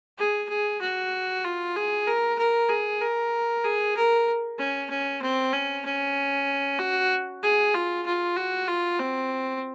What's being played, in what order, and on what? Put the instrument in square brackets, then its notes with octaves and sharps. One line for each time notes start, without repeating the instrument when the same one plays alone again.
[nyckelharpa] G#4
G#4
F#4
F4
G#4
A#4
A#4
G#4
A#4
G#4
A#4
C#4
C#4
C4
C#4
C#4
F#4
G#4
F4
F4
F#4
F4
C4